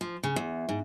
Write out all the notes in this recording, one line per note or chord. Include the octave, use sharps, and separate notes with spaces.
F3
C#3
E2
G#2